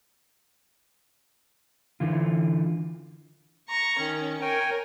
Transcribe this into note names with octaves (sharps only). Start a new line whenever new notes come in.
D3 E3 F4
A#5 C#6
D#3 C#4
A#4 C#5 G5 G#5